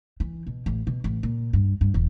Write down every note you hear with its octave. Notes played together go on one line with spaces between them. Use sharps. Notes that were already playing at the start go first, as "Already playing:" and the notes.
E3
B2
A1
B2
A1
A#2
G2
G2
E1